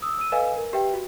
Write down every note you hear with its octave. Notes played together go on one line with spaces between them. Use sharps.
D#6 E6
E6 D#7
A4 B4 D#5 F5 G#5
A#4
G4 B4 E5 G5
F#4